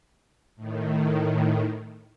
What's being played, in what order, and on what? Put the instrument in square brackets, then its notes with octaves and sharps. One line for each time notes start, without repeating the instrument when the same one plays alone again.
[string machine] A2 D#3